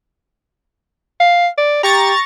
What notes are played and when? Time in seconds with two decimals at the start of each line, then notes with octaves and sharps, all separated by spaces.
1.20 F5
1.58 D5
1.83 G4 A#5 C#6 A6